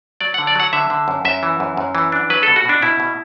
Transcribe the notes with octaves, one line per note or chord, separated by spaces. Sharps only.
F#3 D5
D3 F#5
D5
F#3 F#5
D3 E5
D3
F#2
F#2 E5
E3
F#2
F#2
E3
D4
F#3 B4
B2 A4
F#4
B2 D4
B2 E4
B2